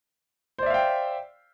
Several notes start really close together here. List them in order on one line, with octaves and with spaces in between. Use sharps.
C5 D5 E5 F5 G5